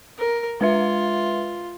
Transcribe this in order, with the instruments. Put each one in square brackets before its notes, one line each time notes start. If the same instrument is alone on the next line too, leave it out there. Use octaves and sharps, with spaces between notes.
[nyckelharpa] A#4
[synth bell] G#3 B4 E5 [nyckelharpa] F4